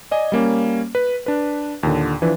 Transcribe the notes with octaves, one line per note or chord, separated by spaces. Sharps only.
D5 D#5 G#5
G3 A#3 C#4
B4
D4 B4
D#2 A#2 D3
E3 F3 D4 B4